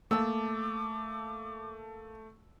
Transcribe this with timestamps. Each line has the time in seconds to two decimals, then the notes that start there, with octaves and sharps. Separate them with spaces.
0.11 A3 A#3 A5 D6 E6